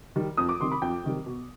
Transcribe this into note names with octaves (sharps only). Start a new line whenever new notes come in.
D#3 G3
F2 D#6
D6
C3 D#3 G3 C6
B5
F2 G5
C3 D#3 G3
B2